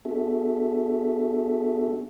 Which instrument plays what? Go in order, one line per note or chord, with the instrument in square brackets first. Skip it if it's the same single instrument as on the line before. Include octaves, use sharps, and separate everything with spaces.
[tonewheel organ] B3 D4 F#4 G#4 A4 E5